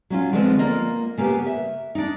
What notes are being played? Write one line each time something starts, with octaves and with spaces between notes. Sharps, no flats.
F#3 C#4 F4
D3 F3 G#3 B3 C4
A#3 F4 D#5
C#3 A#3 B3 G4
E5
D4 D#4